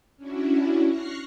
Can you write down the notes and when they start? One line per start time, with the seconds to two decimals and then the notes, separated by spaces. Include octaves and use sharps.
0.17 C#4 D4 E4 F#4
0.86 C#6 F6 F#6 A#6 C7